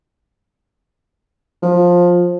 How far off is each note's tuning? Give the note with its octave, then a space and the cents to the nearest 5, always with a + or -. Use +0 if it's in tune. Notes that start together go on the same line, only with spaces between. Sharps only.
F3 +15